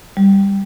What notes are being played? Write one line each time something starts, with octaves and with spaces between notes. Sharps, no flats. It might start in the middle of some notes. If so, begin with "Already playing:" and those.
G3